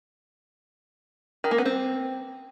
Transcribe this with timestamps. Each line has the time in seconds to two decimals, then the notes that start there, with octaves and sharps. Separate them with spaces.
1.44 D#3
1.51 A#3
1.58 B3
1.66 C4